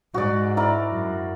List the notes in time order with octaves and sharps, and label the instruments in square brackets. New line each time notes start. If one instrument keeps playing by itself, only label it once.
[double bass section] G#2 [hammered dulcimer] F#4 D5
[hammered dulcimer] E4 A#4 D5
[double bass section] F#2